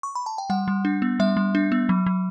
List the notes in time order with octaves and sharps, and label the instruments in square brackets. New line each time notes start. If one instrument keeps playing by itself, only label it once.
[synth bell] C#6
B5
A5
G5
G3 F#5
G3
D4
B3
G3 E5
G3
D4
B3
F#3
F#3